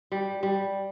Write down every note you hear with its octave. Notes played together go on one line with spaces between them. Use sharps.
G3
G3